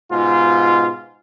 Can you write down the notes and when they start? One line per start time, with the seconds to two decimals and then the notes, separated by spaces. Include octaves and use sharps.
0.11 G#2 B2 F4